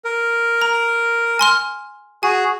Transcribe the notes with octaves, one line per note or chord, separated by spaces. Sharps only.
A#4
A#5
G#5 C6 F6
F#4 G#4 G#5